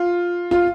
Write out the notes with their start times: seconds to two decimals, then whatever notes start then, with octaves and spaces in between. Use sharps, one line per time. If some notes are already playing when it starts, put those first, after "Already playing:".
Already playing: F4
0.51 F4